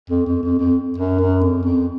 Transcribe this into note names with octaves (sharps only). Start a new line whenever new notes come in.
F2
F2
F2
F2
F#2
F#2
F2
F2